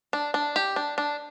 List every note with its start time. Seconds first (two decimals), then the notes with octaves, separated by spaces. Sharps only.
0.13 D4
0.34 D4
0.56 G4
0.76 D4
0.98 D4